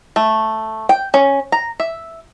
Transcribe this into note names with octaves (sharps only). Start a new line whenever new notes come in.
A3
G5
C#4
A#5
E5